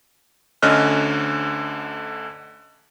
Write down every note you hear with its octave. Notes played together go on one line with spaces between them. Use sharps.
D2 D3 C#4 D#5 F6 F#6